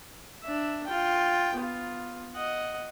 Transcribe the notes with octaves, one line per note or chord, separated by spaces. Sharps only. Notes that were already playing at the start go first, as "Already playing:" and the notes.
D4 E5
F4 G5
B3 F4
D#5 F#5